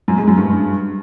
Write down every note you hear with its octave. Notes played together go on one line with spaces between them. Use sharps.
F#2
G#3
F#2
G2